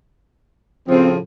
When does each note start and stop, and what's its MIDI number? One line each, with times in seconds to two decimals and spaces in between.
0.88 1.18 45
0.88 1.18 49
0.88 1.18 53
0.88 1.10 60